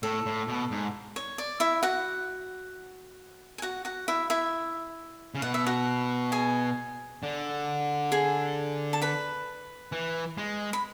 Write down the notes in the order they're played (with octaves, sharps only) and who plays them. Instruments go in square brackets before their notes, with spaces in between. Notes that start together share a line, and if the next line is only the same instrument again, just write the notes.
[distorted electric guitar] A2 [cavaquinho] A4
[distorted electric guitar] A2
B2
G#2
[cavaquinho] C#5
D5
E4 E5
F#4 F#5
G#5
F#4 F#5
F#4 F#5
E4 E5
E4 E5
[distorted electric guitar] C#3
[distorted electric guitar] B2 [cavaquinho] F#5
[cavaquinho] E5
F#4 F#5
G#4 G#5
[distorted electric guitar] D3
[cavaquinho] G#4 G#5
A5
B4 B5
[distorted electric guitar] E3
G#3
[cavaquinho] B5